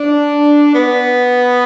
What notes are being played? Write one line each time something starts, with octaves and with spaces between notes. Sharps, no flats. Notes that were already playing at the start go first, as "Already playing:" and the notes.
Already playing: D4
B3